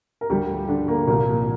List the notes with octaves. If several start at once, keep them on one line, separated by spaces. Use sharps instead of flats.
A#4
D2 D3 F3 G3 G4
D3 D4
A#3
C2 A#2 F3 A#3